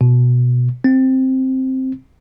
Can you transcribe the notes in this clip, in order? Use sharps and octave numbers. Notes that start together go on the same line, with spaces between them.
B2
C4